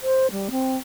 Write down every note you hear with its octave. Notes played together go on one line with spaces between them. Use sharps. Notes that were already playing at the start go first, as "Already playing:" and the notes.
C5
G3
C4